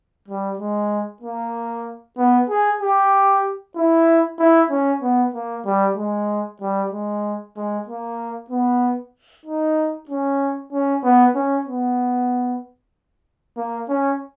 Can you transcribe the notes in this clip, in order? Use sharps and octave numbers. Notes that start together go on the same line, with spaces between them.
G3
G#3
A#3
B3
G#4
G4
E4
E4
C#4
B3
A#3
G3
G#3
G3
G#3
G#3
A#3
B3
D#4
C#4
C#4
B3
C#4
B3
A#3
C#4